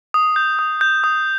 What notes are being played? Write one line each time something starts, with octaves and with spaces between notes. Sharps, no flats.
D#6
G6
D#6
G6
D#6